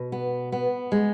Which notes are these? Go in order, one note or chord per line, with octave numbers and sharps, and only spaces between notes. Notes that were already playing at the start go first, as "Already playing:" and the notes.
Already playing: B2
B3
B3
G#3